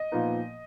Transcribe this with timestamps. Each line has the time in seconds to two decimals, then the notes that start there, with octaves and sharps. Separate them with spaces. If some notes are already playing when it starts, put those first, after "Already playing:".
Already playing: D#5
0.12 A#2 F3 B3 D#4